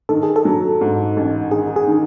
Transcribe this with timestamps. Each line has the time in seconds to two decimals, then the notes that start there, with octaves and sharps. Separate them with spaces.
0.09 D#3 A4
0.23 G#4
0.36 A4
0.45 F#3
0.81 G#2
1.17 A1
1.51 D#3 G#4
1.76 G#4
1.88 D#3